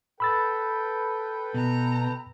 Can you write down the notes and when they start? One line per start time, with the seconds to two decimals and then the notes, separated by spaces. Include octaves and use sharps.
0.20 A4 B4 G5 B5 E6 A6
1.54 B2 A#5